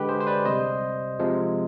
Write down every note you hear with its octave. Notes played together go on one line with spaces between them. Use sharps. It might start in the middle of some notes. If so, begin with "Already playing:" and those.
Already playing: D3 G#3 G4 B4
G#4 C5
C5
B4 D5
C3 G3 C5 D#5
C3 F3 G#3